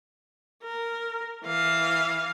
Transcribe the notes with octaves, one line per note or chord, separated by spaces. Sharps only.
A#4
E3 F5